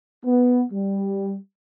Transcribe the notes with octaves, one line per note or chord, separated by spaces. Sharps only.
B3
G3